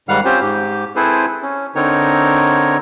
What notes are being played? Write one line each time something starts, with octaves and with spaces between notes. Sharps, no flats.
G#2 D#3 G3 F5 F#5 F6
C4 C#4 F4 G4 C5
G#2 G4
C4 E4 G#4 A4 B4 C5
C#4
D3 C4 D#4 A#4 C#5